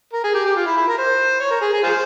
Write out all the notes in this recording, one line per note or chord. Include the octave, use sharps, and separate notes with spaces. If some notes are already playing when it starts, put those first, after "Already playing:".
A#4
G#4
G4
G4
F4
E4
E4
A#4
C5
C#5
A#4
G#4
G#4
F4 G#4 C5